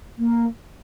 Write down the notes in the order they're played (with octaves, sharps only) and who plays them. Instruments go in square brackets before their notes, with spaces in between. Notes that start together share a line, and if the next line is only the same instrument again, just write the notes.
[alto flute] A#3